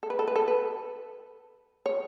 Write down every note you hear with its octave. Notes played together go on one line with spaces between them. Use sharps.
A4
B4
A4
B4
A4
B4
C#5